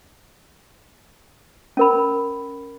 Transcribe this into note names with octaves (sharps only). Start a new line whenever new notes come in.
C#4 A#4 B5